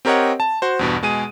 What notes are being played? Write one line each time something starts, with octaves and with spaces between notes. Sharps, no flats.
C4 G4 A#4 C#5 D#5 F#5
A5
F#4 C5
E2 G2 B2
B2 G#3 G#4 D#7